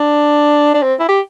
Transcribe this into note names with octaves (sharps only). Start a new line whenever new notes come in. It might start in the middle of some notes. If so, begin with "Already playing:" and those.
Already playing: D4
D4
C4
E4
G4